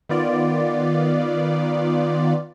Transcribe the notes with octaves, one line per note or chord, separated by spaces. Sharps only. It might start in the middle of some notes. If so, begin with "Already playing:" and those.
D#3 B3 F4 D5